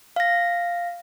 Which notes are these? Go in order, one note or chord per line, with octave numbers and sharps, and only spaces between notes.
F5 A#6